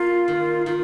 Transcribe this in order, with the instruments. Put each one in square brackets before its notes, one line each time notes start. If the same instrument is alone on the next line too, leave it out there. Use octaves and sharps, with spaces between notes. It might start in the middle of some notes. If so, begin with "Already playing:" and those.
Already playing: [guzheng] A#3 [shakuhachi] F4
[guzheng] D#3
[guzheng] D#3 [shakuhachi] F4